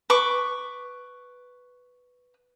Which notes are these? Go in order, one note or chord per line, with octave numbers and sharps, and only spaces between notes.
B4 C#6 D6